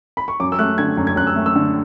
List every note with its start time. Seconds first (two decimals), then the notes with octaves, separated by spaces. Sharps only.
0.17 B5
0.28 C#6
0.40 F#2 D6
0.52 E6
0.59 A3 F#6
0.78 D3 G#6
0.97 F#2
1.07 G#6
1.16 F#2 F#6
1.27 E6
1.36 A3
1.46 E6
1.56 D3